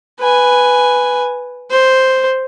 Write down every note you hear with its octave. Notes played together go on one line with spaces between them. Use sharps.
B4 G#5
C5